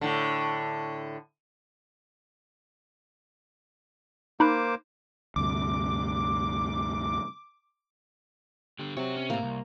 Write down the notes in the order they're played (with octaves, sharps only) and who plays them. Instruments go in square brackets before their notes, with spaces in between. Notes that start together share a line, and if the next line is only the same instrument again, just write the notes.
[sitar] A2 D3
[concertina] A#3 C5 D6 [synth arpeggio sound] D#4 B5 F#6
[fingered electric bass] D2 G2 C3 [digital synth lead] D6
[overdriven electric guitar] D3 G4
[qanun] C3 [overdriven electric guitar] F#4 C#5
[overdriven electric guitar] C#4
[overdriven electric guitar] A2 [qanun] A#3 A#5
[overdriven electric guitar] C2